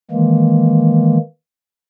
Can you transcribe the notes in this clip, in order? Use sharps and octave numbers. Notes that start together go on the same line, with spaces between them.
D#3 E3 G#3 A#3